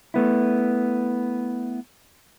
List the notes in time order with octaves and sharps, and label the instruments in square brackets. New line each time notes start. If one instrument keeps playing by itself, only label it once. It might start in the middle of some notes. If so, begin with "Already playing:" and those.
[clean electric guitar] A3 B3 E4